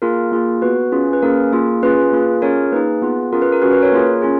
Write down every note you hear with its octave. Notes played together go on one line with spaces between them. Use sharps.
A#3 F4 G#4 A#4
A#3 F4 G#4
B3 F#4 B4
C#4 F4 G#4
B4
A#3 C#4 G#4 A#4
A#3 F4 G#4
C#4 F4 G#4 B4
A#3 F4 G#4
C#4 F4 G#4 A#4 C#5
A#3 D#4 G#4 B4
B3 F4 G#4
C#4 F4 G#4 A#4
B4
A#4
C#4 F#4 B4
B4
A#4 C#5
A#3 F4 G#4
C#4 F4 G#4